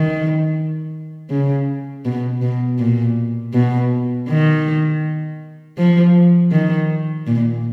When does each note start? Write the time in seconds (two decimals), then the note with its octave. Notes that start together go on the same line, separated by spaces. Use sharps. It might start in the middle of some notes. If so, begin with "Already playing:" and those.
Already playing: D#3
1.30 C#3
2.05 B2
2.42 B2
2.79 A#2
3.54 B2
4.28 D#3
5.78 F3
6.51 D#3
7.27 A#2